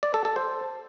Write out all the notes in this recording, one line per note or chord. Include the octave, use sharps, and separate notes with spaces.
D5
A4
A4
C5